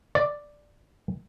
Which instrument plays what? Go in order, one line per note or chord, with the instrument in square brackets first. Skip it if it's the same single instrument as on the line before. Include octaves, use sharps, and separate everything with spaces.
[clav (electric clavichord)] D5